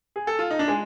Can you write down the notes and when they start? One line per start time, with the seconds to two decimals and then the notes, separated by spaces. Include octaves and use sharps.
0.16 G#4
0.27 A4
0.39 F4
0.50 D#4
0.59 D4
0.68 G#3